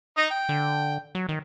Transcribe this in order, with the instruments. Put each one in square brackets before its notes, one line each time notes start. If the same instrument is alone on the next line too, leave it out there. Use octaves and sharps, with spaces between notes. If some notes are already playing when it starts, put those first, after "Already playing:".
[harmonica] D#4 D#5
G5
[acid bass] D3
F#3
D#3